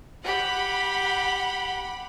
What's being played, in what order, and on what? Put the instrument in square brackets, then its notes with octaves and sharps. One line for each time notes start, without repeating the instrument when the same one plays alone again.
[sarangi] G4 [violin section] F#5 B5